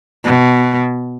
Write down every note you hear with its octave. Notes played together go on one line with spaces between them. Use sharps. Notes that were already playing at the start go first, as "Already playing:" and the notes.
B2